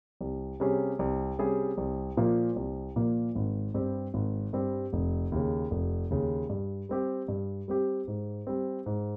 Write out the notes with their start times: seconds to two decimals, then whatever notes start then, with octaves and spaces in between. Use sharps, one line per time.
0.21 C2
0.60 C3 G3 C#4 G#4
0.99 C2
1.39 C3 G3 C#4 G#4
1.78 C2
2.17 A#2 F3 A#3
2.56 C2
2.96 A#2 F3 A#3
3.35 G#1
3.74 G2 G3 C4 G4
4.14 G#1
4.53 G2 G3 C4 G4
4.93 F1
5.32 D#2 C#3
5.71 F1
6.10 D#2 C#3
6.49 G2
6.89 G3 C4 G4
7.28 G2
7.68 G3 C4 G4
8.08 G#2
8.47 G3 C4
8.86 G#2